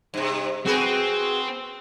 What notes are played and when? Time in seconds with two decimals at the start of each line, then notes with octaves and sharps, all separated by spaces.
0.14 G2 C3
0.66 C4 F#4 G#4 B4